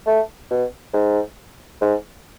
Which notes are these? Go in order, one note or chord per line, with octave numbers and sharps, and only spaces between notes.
A3
B2
G#2
G#2